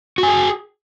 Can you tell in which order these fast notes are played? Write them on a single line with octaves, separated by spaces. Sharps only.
F#4 G#5 G#4